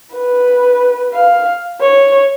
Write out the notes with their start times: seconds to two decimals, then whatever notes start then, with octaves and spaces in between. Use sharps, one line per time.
0.13 B4
1.14 F5
1.81 C#5